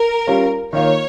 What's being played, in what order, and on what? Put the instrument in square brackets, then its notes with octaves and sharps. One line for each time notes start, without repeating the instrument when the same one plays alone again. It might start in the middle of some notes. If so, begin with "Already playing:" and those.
Already playing: [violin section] A#4
[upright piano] G3 C#4 F4
[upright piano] D#3 A#3 F4 [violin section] C#5